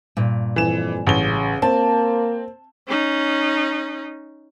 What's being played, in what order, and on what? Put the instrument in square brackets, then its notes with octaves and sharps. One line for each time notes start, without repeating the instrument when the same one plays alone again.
[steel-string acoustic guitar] G2 A#2
[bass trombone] F2 [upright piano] E3 E7
[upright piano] A1 G7 [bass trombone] C#3
[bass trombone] A#3 [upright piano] C4 [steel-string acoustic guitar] A5
[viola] C#4 D#4